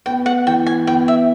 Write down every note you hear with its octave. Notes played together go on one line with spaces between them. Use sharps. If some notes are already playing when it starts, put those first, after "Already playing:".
B3 G5
F#5
E3 G5
G#5
B3 G5
E5